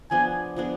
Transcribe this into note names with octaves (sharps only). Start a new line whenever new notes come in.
F3 B3 D4 G#4 G#5
F3 B3 D4 G#4